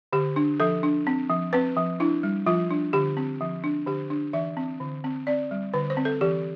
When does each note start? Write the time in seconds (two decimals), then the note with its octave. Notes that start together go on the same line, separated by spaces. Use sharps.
0.13 D3 G4
0.36 D4
0.60 F3 A4
0.83 D4
1.07 C4
1.30 F3
1.53 C4 B4
1.77 F3
2.00 D4 E4
2.23 G3
2.46 F3 F4
2.71 D4
2.93 D3 G4
3.17 C4
3.41 F3
3.64 D4
3.87 D3 G4
4.10 D4
4.33 E3 E5
4.57 C4
4.80 D3
5.04 C4
5.27 C4 D5
5.51 G3
5.74 D3 B4
5.90 C5
5.97 C4
6.05 A4
6.21 E3 G4